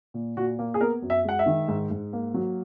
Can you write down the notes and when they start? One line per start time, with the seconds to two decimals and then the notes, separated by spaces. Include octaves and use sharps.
0.14 A#2
0.37 A#2 F#4
0.59 A#3
0.74 G#4
0.81 B3 A#4
1.02 F#2
1.10 E5
1.25 G#3 F#5
1.39 E5
1.46 D#3
1.68 G#2
1.91 G#2
2.13 A#3
2.34 F#3